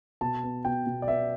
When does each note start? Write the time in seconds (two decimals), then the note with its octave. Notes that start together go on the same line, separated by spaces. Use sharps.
0.21 B2 A5
0.43 B3
0.65 B2 G5
0.87 B2
1.02 D5
1.08 B3 E5